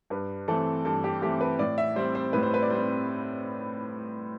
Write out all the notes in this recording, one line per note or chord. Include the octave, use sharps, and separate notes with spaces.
G2 B4
E3 A3 C4 A4
G2 A4
G4
E3 A3 C4 G4
B4
A2 D5
E5
G3 C4 C5
C5
A2 B4
C5
B4
D5
G3 C4 C5